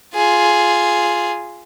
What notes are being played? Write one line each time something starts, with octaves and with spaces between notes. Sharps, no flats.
F4 G#4